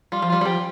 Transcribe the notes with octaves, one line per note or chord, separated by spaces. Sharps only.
G3 F4
F3
G3 F4
G3
F3 G4